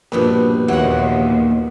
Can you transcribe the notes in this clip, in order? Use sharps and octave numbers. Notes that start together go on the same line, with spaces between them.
A#1 G2 B2 B4
D#2 A#2 E3 F#3 F#5